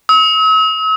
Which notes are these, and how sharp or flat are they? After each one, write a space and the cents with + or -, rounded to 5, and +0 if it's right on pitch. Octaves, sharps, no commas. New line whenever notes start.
E6 -45